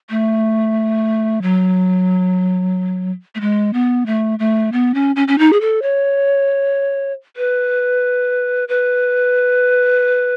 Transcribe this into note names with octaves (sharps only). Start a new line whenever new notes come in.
A3
F#3
A3
G#3
B3
A3
A3
B3
C#4
C#4
C#4
D#4
G#4
A4
C#5
B4
B4